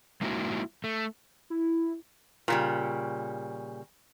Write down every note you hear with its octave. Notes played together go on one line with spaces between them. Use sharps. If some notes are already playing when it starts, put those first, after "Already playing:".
G#3 A#3 D#4 E4 F#4
A3
E4
A#2 C#3 G3